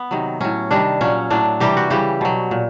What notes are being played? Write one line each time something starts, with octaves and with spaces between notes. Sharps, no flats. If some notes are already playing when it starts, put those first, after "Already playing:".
Already playing: B3
C3 D#3 F#3
A2 F#3 C#4
C3 D#3 G3 D4
A#2 F#3 C#4
A2 F#3 D4
C3 E3 G3 G4
F#4
C#3 E3 G3 G4
B2 F#3
A#2